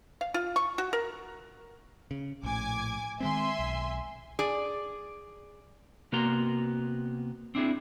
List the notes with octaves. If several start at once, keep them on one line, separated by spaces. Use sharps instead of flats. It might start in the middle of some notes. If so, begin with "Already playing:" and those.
F5
F4
C#6
F#4
A#4
C#3
A#1 A2 G#5 D6 G#6
D#3 G#3 C4 E5 G#5 C6
B1
G#4 D5
C3 A#3 B3 F#4 A#5 C6
C4 D4 E4 G#4